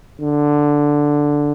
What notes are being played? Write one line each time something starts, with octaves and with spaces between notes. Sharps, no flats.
D3